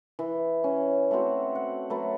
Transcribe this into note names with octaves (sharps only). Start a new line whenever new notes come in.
E3
C#4
A3 C4 F#4 C5
F#5
F#3 A3 B4